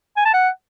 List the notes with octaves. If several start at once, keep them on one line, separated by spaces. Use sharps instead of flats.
G#5
A5
F#5